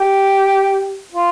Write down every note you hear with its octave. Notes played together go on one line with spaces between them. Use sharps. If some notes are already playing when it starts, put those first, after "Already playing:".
Already playing: G4
F4